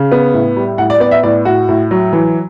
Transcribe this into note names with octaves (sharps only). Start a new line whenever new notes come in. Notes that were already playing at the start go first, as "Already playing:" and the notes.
Already playing: C#3
B3
A2
G3
A2 F#5
D5
B3 D5
E5
A2 D5
A2 F#4
A2
F#3
E3